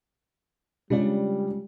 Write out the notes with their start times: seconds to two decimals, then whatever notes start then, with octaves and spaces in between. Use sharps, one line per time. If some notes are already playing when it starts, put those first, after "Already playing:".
0.90 C#3 G3 G#3 C#4 D4 F4